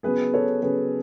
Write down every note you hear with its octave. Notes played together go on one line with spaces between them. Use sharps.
C#3 F#3 B3 G#4 B4
A4 C#5
C#3 F#3 B3 G#4 B4